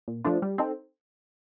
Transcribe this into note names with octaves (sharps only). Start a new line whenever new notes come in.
A#2
F3 A3 D4 F4
G3
C4 D#4 A4